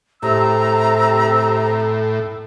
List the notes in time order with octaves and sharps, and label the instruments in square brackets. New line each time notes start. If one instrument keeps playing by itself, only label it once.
[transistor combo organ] A2 [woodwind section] C3 E6 [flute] A#5